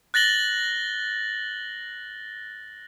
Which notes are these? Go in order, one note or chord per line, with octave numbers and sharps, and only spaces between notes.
F#6 A6 A#6 F#7 G7